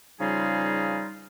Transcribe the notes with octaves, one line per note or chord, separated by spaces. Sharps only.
C#3 F3 G3 D#4 F4 G#4